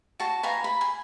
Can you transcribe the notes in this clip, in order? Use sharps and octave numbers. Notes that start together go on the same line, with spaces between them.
F#4 A5
B4 F5 G#5 A#5
B5
G#5